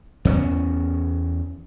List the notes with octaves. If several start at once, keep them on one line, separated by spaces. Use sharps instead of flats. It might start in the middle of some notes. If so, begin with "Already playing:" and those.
E2 A3 C#4